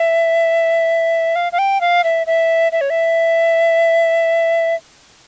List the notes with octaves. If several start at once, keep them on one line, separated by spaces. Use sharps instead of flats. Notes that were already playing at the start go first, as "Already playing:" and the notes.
Already playing: E5
F5
F5
G5
F5
E5
E5
E5
C#5
E5